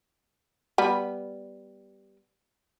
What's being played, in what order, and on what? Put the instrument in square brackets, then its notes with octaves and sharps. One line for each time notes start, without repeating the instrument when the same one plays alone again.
[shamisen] G3 B3